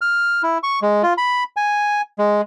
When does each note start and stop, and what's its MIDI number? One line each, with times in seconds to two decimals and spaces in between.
0.01 0.42 89
0.43 0.58 64
0.63 0.79 85
0.82 1.02 56
1.03 1.14 65
1.18 1.44 83
1.57 2.01 80
2.19 2.41 56